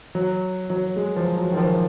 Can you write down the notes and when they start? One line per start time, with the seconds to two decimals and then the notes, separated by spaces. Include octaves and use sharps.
0.15 F#3
0.70 F#3
0.96 G#3
1.16 F3
1.37 F#3
1.52 D#3
1.57 F3